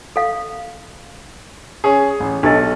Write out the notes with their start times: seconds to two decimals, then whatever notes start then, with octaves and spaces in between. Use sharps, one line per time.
0.16 A4 F5
1.84 C#4 G#4
2.20 A1
2.43 B1 D4 G4 A4 D#5